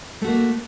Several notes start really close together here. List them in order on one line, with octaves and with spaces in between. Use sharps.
A3 F#4 A#3